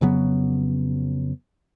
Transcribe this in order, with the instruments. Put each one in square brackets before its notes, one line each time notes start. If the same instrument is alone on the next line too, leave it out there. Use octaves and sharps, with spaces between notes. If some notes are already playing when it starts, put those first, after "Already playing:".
[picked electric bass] F2 C#3 F#3 B3